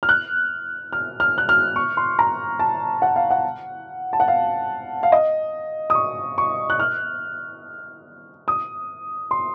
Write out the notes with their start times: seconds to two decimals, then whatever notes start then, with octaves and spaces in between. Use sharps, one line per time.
0.03 F6
0.09 F#6
0.93 F6
1.20 F6
1.38 F#6
1.49 F6
1.76 C#6
1.97 C6
2.19 A#5
2.59 A5
3.02 F#5
3.16 F5
3.31 F#5
4.13 A5
4.20 F#5
4.28 F5
5.03 F5
5.12 D#5
5.90 D#6
5.95 C#6
6.38 C#6
6.70 F#6
6.80 F6
8.48 D#6
9.31 C6